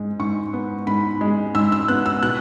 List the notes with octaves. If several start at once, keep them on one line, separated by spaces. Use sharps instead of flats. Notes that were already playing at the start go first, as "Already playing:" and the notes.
Already playing: G#2 G#3
G#2 C#6
B3
G#2 B5
G#3
G#2 E6
E6
B3 F#6
E6
B2 F#6